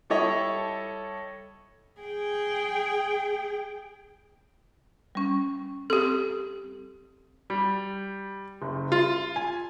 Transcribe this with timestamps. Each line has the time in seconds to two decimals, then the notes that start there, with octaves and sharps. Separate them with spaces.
0.10 G3 E4 A4 C#5 D#5
2.01 G#4 G5
5.15 G3 C#4
5.90 C4 G4 A4
7.50 G3
8.62 F#1
8.92 F4
9.36 G#5